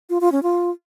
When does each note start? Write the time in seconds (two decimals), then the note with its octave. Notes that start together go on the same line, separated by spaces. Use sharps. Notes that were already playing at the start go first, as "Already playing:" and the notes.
0.10 F4
0.21 F4
0.32 C#4
0.43 F4